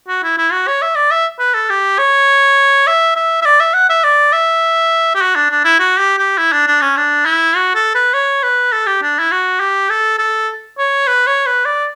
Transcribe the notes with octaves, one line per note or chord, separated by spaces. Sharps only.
F#4
E4
E4
F#4
C#5
E5
D5
E5
B4
A4
G4
C#5
E5
E5
E5
D5
E5
F#5
E5
D5
E5
G4
F#4
D4
D4
E4
F#4
G4
G4
E4
D4
D4
C#4
D4
E4
F#4
A4
B4
C#5
B4
A4
G4
D4
E4
F#4
G4
A4
A4
C#5
B4
C#5
B4
D5